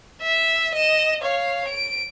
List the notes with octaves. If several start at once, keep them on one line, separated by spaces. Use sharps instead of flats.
E5
D#5 E7
C#5 F5
D7